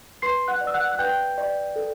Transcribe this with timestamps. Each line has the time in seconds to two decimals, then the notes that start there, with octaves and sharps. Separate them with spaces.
0.22 B4 C6 C7
0.48 F#5 F#6
0.61 D5
0.67 E6
0.74 F#5 F#6
0.92 F#6
0.99 B4 G5 G6
1.38 D5
1.76 A4